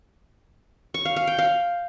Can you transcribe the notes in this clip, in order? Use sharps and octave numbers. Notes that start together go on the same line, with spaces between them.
C#6
F5
F5
G5
F5